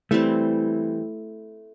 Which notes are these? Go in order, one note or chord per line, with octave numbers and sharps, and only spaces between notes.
E3 G3 A3 C4